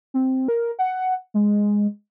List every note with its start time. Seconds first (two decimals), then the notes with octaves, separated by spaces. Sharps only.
0.14 C4
0.48 A#4
0.79 F#5
1.34 G#3